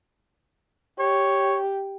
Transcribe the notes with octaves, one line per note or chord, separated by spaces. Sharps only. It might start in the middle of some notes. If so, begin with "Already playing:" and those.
G4 C#5